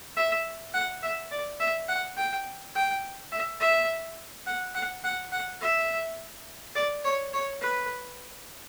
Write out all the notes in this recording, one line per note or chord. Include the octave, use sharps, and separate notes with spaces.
E5
F#5
E5
D5
E5
F#5
G5
G5
E5
E5
F#5
F#5
F#5
F#5
E5
D5
C#5
C#5
B4